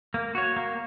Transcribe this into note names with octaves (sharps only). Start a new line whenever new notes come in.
A#3
F#4 C#5
A#3